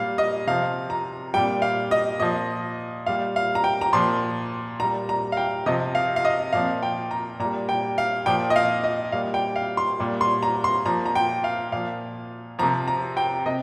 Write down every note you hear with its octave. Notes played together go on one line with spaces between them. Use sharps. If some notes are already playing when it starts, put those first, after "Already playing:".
Already playing: A#2 G3 F5
D#5
C3 F3 F5
A#5
A#2 G3 G5
F5
D#5
A#2 F3 D#5
A#2 G3 F5
F5
A#5
G5
A#5
A#2 F3 C6
A#2 G3 A#5
A#5
F5
G5
C3 F3 D#5
F5
F5
D#5
A#2 F3 F5
G5
A#5
A#2 A#5
G3
G5
F5
A#2 F3 G5
D#5
F5
D#5
A#2 G3 F5
G5
F5
C6
A#2 G3
C6
A#5
C6
A#2 F3 A#5
A#5
G5
F5
A#2 F3 F5
C3 F3 A#5
A#5
G5
C3 D#5